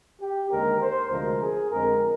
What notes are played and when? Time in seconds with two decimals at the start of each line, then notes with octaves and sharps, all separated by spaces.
0.19 G4
0.50 D#2 D3 G#3 C4 A#4
0.80 C5
1.10 D2 C3 F3 G#3 A#4
1.41 G#4
1.71 F2 D3 G#3 C4 A#4